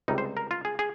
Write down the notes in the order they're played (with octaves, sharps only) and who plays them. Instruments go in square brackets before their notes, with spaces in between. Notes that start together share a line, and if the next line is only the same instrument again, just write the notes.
[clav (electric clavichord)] C#2 C3 G3 D#4
C5
A#4
F4
G#4
G#4